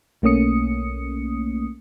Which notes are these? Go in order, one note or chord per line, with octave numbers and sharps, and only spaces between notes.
B1 A3 A#3 C#4 D#6 C#7